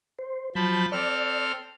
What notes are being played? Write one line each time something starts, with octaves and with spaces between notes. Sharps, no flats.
C5
F3 F#3 A5 B5 G6
C4 A4 D5 F6